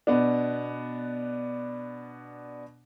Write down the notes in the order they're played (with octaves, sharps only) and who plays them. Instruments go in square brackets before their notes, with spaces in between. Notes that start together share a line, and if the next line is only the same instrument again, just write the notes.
[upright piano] B2 B3 D4